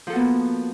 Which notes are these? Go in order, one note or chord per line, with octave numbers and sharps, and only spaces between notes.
F3 A#3 B3 F#4 A4